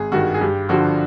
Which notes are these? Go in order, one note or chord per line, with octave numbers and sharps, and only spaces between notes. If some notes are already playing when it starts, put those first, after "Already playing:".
Already playing: G#1 G#4
G2 D#3 F#4
G#4
G2 G4
D3 F3 F#4